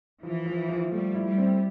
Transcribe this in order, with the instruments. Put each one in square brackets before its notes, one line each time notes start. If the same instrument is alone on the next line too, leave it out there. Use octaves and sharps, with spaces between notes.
[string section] E3 [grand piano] F3
[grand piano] F3
F3
[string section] G3 [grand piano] A3
[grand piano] E4
[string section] G3
[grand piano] C4